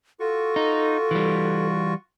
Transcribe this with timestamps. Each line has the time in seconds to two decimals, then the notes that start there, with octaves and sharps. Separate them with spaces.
0.20 F4 F#4 A4 C#6
0.56 D#4
1.11 E3 G3